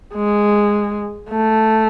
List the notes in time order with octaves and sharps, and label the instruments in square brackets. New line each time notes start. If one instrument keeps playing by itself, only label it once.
[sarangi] G#3
A3